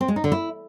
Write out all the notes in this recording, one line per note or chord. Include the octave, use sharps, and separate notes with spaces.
C4
G#3
D#4
D3
E4